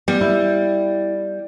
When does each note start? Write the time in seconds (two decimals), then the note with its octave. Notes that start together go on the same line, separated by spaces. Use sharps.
0.08 G3 B3
0.21 E4